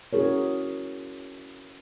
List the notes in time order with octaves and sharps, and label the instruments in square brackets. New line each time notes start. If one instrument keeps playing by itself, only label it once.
[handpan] C#4 E4 F#4 G#4 A#4 C#5